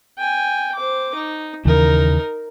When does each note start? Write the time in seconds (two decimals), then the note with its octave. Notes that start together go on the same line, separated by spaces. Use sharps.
0.18 G5 G#5
0.75 C5 D6
1.14 D#4
1.65 D#2 C#3 E3 D#4 A#4